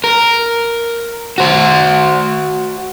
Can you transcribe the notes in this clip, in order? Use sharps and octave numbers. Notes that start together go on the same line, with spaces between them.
A#4
F#4 C5